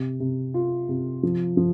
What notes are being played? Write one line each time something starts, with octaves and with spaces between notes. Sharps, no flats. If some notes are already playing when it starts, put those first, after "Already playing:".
Already playing: C3
C3
F4
C3
F3
F3